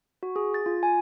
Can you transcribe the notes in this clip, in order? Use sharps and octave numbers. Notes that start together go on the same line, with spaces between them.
F#4
G#4
A6
F4
G#5